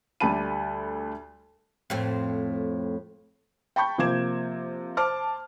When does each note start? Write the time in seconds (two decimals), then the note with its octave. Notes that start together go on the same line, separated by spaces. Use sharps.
0.20 D2 G3 A3 A5 B5 D#7
1.90 F2 A2 C4
3.76 G5 A5 B5 C#6 G6
3.98 C3 F3 A#3 D6 G#6 E7
4.97 C5 A5 D6 F6